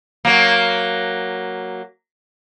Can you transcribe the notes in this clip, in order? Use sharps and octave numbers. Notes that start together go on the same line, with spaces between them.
F#3 A#3